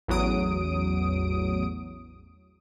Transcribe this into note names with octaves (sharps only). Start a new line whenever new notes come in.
A1 E2 F#3 D#6 D7